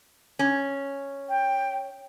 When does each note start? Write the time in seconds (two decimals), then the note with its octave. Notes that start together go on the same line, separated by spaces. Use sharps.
0.39 C#4
1.29 G5